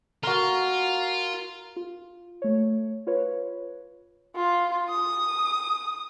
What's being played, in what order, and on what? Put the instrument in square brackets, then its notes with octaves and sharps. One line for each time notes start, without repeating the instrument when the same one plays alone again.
[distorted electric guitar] F4 [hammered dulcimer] F#4 A#4
[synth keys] F4
A3 C#5
F4 B4 C#5
[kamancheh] F4
D#6